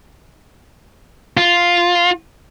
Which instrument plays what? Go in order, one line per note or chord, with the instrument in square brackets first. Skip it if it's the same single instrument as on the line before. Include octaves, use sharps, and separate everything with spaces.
[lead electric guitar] F4